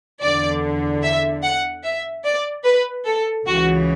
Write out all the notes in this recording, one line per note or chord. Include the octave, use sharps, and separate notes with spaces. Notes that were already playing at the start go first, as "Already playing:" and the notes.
E2 D3 D5
E5
F#5
E5
D5
B4
A4
C#2 C#3 E3 F#4